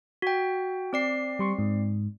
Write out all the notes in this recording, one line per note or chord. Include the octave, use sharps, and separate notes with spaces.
F#4 G5
C4 D5 C7
G3 C6 C#6
G#2